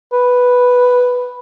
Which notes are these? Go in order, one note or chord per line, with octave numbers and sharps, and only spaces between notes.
B4